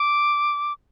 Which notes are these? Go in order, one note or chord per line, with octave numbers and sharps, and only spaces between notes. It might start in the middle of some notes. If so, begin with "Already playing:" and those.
Already playing: D6